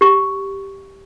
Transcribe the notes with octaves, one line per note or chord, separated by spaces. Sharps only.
G4 C#6